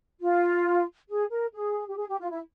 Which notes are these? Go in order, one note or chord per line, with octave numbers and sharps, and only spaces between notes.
F4
G#4
A#4
G#4
G4
G#4
G4
F4
E4